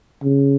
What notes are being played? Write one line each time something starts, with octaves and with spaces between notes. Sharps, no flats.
C#3